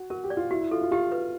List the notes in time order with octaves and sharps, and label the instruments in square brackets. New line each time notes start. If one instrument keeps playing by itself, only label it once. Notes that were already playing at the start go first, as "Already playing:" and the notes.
Already playing: [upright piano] F#4
[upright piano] F#4 [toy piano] A#4
[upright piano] G4
[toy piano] D5
[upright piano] F4
[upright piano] E4 [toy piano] F#4
[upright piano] E4
[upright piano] F4 [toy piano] A4
[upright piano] F4
[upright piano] F4 [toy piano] G4
[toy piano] B4